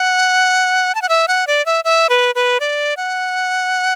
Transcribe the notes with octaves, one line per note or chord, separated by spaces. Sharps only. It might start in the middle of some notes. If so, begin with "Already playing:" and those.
Already playing: F#5
A5
F#5
E5
F#5
D5
E5
E5
B4
B4
D5
F#5